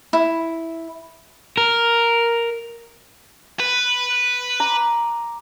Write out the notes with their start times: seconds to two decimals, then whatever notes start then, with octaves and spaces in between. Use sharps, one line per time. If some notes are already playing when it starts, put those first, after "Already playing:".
0.13 E4
1.57 A#4
3.59 B4
4.60 A#5 D6